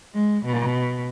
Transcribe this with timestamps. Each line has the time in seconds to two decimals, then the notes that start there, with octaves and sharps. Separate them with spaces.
0.14 G#3
0.45 B2